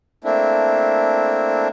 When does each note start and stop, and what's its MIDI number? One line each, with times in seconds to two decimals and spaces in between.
0.24 1.68 57
0.24 1.68 58
0.24 1.68 60
0.24 1.68 62
0.24 1.68 64